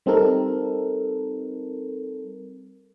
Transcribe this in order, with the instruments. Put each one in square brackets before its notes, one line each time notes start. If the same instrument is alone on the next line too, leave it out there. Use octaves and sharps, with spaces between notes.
[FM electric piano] G3 C4 D#4 A4 A#4